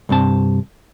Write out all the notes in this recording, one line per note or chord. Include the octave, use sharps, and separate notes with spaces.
C2 G2 C4 A5